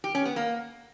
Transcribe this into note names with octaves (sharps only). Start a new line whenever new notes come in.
G4
C#4
B3
A#3